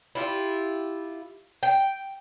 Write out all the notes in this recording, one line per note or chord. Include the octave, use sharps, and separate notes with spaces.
E4 F4 G4
G5